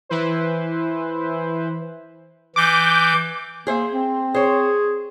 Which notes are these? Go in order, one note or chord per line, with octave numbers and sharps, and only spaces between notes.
E3 E4 B4 C5
E3 D6 G6
A#3 G#4 C5 E5
C4
G#4 C5 C#5